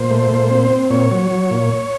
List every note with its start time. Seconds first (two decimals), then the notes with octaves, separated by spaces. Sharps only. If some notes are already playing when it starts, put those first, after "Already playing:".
Already playing: A#2 C5
0.11 A3
0.31 A#2
0.51 C4
0.71 C4
0.90 A#2 C#5
1.11 F#3
1.31 F#3
1.51 A#2